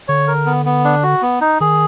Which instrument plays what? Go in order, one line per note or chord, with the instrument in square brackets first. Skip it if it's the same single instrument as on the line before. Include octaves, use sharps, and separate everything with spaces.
[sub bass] D3 [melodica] C#5
[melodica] A#4
B3
B3
D4
F#4
B3
D#4
[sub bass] D#3 [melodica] G#4